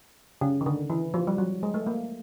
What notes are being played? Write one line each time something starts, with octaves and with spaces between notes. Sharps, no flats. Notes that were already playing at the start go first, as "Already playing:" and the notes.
C#3
D#3
D3
E3
F3
G3
F#3
G#3
A3
A#3